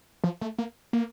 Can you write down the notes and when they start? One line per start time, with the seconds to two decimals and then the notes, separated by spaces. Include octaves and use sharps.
0.24 F3
0.41 A3
0.58 A#3
0.93 A#3